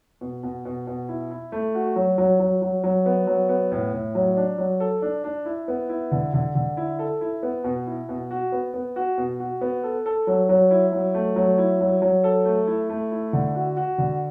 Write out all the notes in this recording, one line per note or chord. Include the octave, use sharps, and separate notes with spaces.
B2
B2
B2
B2
E4
E4
A3
F#4
F#3
F#3
F#3
F#3
F#3
B3
F#3
B3
A2
A2
F#3
D4
F#3
A4
D4
D4
E4
B3
E4
D3
D3
D3
E4
A4
E4
B3
B2
E4
B2
F#4
B3
B3
F#4
B2
F#4
B3
A4
A4
F#3
F#3
E4
F#3
A3
F#3
E4
F#3
F#3
A4
A3
E4
A3
E4
D3
F#4
F#4
D3